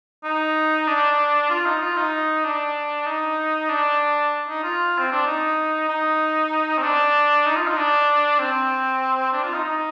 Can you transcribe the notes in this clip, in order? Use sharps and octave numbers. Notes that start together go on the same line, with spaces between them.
D#4
D4
F4
D#4
F4
D#4
D4
D#4
D4
D#4
F4
C4
D4
D#4
D#4
C4
D4
D#4
F4
D#4
D4
C4
D4
F4
D#4
D#4